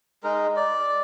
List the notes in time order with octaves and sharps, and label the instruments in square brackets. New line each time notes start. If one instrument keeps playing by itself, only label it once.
[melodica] G#3 D#4 A#4
D5